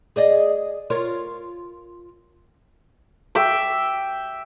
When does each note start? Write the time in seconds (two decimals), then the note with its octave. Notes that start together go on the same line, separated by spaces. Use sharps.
0.16 G#4 D5 D#5
0.90 F4 A#4 C#5
3.35 E5 G5 D6